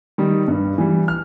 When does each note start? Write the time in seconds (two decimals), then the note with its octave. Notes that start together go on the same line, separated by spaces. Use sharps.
0.18 D#3 G3
0.48 G2
0.78 E3 G3
1.08 F6